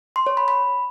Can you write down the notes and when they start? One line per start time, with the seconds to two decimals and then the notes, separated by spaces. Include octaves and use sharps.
0.16 C6
0.27 C#5
0.37 B5
0.48 B5